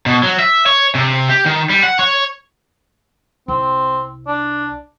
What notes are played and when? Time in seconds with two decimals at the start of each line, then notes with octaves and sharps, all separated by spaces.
0.06 B2
0.23 F#3
0.39 E5
0.66 C#5
0.95 C3
1.29 G4
1.46 D#3
1.70 G3
1.83 F#5
1.99 C#5
3.48 C2 C4
4.27 D4